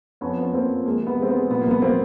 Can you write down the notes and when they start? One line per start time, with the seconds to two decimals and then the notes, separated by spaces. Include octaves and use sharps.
0.21 F2 B3 C#4
0.38 F3 B3
0.53 F2 A#3 C4
0.69 F3
0.86 G#3 A#3
1.02 C3 B3
1.18 G#3 C4
1.29 B3
1.34 G#3
1.50 A#2 B3
1.61 A#3
1.67 C2 B3
1.82 F#3 A#3 C4